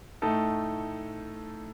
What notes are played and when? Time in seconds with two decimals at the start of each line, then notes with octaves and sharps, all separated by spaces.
0.22 A2 A3 D#4 A4